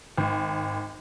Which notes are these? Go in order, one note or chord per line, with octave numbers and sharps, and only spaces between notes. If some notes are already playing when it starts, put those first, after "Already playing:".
G#1